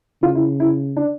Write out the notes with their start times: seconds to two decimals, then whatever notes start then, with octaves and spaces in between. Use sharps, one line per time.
0.23 C#3 F4
0.35 E4
0.60 E4
0.96 D4